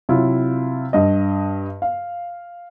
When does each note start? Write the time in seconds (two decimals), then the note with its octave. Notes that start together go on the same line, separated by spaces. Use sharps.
0.09 C3 F#3 E4 F4
0.93 G2 D#5
1.82 F5